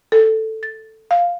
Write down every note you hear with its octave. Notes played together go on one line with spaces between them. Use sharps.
A4
A6
F5